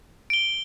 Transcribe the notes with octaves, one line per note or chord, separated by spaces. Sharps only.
D7 G7